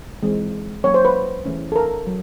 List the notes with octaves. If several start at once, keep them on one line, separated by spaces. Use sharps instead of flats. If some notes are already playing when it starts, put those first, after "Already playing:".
E3 G#3 C4
F#3 A#3 C#4 C#5
C5
B4
E3 A3 C#4
A4
A#4
F#3